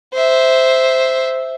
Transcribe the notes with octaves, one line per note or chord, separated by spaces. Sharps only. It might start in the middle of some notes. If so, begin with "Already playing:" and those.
C5 E5